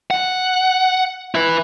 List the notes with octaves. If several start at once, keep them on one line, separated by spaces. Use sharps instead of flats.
F#5
E4 B4